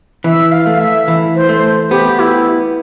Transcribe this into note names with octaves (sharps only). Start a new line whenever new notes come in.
E3 E5
F5
A3
E5
E3
C5
A3
B3 G4
E4